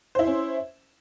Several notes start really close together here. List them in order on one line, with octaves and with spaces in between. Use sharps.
C5 E4 E5 C#4